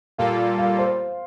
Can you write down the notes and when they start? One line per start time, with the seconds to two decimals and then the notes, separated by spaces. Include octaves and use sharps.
0.18 A#2 G3 A#3 F4 A4 F5
0.58 F5
0.79 C5